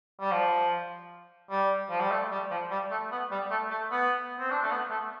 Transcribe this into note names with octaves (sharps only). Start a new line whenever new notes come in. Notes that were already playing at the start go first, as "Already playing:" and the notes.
G3
F3
G3
F3
G3
A3
G3
F3
G3
A3
B3
G3
A3
A3
B3
C4
D4
A3
B3
A3